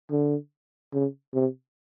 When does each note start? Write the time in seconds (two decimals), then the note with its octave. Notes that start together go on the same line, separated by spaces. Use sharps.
0.11 D3
0.93 C#3
1.34 C3